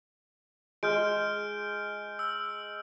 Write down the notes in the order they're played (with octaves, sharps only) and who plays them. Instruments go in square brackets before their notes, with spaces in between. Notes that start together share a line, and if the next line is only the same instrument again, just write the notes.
[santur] G#3 [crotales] F6 G6 D7
[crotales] E6